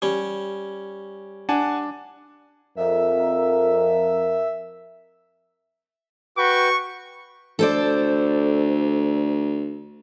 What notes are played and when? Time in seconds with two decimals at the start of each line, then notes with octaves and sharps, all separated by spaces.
0.02 G3 C#4
1.49 D4 F#5 G#5 A5
2.77 F2 A#4 E5
6.38 F#4 B4 G5 C#6
7.59 D2 A4 C5 D5